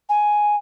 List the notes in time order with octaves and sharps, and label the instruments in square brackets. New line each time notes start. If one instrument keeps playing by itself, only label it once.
[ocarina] G#5